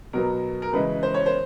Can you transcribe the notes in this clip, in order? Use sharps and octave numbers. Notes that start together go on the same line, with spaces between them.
B2 F#3 B3 A#4
A#4
C#3 E3 G#3 B4
C5
C#5
C5